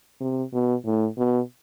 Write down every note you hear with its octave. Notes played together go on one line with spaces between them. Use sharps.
C3
B2
A2
B2